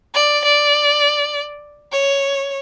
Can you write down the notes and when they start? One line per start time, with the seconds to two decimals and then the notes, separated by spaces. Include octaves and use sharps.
0.14 D5
0.45 D5
1.92 C#5